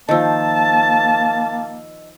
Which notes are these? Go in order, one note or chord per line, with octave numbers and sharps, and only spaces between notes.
D#3 F3 A#3 D#5 A5 E6